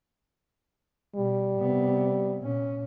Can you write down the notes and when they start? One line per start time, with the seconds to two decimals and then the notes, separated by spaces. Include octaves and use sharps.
1.16 B2 G3
1.59 C3 B3
2.39 A#2 C#4